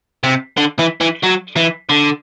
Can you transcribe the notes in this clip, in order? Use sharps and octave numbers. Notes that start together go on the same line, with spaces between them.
C3
D3
E3
E3
F#3
E3
D3